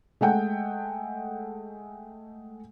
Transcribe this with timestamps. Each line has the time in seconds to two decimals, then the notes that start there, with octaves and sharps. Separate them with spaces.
0.21 G#3 A3 F#5 G5